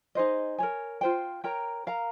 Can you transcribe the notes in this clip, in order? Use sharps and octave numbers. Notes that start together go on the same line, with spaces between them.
D#4 G#4 C5 D#5
A#4 C#5 G#5
F4 C5 G5
A#4 C#5 G5 A#5
A#4 F5 A#5